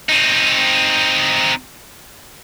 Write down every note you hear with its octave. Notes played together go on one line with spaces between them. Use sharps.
C4 D#4